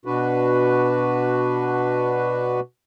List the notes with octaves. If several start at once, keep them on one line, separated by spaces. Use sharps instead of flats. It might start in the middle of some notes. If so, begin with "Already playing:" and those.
B2 D4 F#4 B4